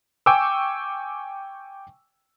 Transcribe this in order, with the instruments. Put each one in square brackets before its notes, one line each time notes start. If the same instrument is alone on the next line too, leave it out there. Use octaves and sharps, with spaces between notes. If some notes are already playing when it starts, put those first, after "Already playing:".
[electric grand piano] G5 G#5 C#6 D6 E6